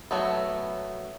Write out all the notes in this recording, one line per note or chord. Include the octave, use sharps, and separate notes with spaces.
F#3 A3 B3